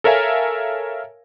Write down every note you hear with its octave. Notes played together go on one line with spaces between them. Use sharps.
A4 A#4 C#5 E5 F5 G#5